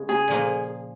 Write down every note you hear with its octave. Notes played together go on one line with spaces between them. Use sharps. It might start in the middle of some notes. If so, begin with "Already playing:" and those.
Already playing: C#3 G#3
G#4
A#2 F3 A#3